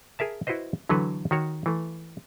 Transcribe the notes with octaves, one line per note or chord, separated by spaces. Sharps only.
G#4 A#4 E5 A5
E4 F#4 B4 C5 D#5
D3 E3 F#3 A3 A4 B4
D#3 F#4 C#5
E3 A3